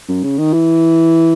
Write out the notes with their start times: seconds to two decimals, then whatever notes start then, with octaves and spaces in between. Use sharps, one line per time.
0.09 F#2
0.23 C#3
0.38 D#3
0.53 E3